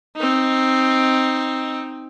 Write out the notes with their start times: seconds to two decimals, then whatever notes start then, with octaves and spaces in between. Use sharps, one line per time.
0.16 C4 D#4